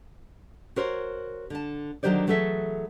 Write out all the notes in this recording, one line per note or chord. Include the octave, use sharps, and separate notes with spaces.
F#4 A#4 C5 C#5
D3 A5
D3 D#3 F#3 G4 C5 D5
E3 F#3 A3 G#4 A4 E5